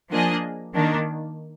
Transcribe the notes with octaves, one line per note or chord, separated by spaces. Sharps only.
F3 A#3 D4 G#4 D#5
D#3 A#3 D4